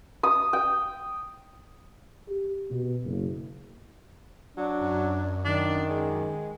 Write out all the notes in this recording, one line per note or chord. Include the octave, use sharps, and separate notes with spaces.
D#6
G5
G4
B2
F#1
F#3 D4
F#2
D#3 D4
G#3